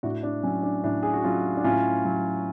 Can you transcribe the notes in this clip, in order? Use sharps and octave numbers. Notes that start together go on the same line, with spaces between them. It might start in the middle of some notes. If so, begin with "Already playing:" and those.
A2 D4 F#4
D4
F#3 C#4
D4
A2 D4
G#4
F#4
F#3 C#4 F4
D4
A2 C#4 F4
F#3